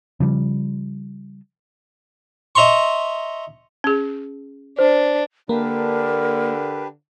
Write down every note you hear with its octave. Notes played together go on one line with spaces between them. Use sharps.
C#3 F3 G3
D#5 E5 A#5 C6 C#6
C#4 G#4
D4 C5
D3 A#3 D4 G4 A#4 B4